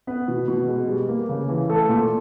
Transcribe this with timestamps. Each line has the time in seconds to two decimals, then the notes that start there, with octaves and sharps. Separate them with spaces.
0.07 B3 B4
0.28 B2
0.48 B2
0.67 G#3
0.89 G3
1.09 A#3
1.29 C#3
1.49 E3
1.70 A3 A4
1.89 A#2